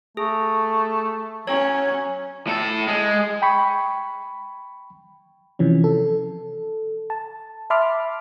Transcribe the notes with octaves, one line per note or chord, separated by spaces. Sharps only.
A3 G#4
F#3 C#4 C#5
A2 A4
G#3
G5 B5 C#6
C3 E3 F3 C#4
A4
A5
E5 A5 B5 C6 D6 F6